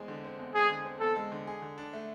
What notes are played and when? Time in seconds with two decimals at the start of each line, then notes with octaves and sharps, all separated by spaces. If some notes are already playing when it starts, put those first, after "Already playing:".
Already playing: E2 G#3 C4
0.08 D3
0.24 C4
0.39 E2
0.55 G#3 G#4
0.70 D3
0.85 C4
1.00 E2 A4
1.16 G#3
1.32 D3
1.47 G#4
1.62 D3
1.78 D4
1.93 A3